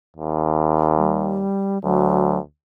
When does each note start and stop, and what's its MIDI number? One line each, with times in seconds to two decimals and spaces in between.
0.16 1.48 39
0.97 1.78 55
1.83 2.39 38
1.83 2.39 54